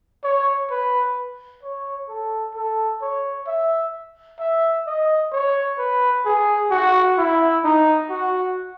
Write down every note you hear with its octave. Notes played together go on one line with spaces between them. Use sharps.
C#5
B4
C#5
A4
A4
C#5
E5
E5
D#5
C#5
B4
G#4
F#4
E4
D#4
F#4